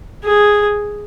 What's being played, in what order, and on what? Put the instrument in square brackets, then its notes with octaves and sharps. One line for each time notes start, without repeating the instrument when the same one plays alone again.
[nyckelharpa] G#4